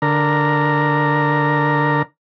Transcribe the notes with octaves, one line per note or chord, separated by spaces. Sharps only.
D3 A#4